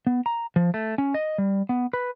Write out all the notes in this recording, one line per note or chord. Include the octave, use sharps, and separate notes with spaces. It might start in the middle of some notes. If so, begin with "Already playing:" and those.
B3
A#5
F3
A3
C#4
D#5
G3
B3
B4